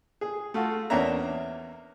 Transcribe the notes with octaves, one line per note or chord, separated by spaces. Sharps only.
G#4
A3 F4 F#4
E2 A#3 C#4 D4 E5 A#5